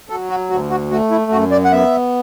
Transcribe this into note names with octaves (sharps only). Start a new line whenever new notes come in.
F#3 A4
F#4
D2 F#4
F#4
A3 F#4
E4
F#2 F#4
D5
F#5
B3 E5